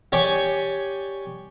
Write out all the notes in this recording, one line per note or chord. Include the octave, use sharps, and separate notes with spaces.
G4 C#5 D5 G#5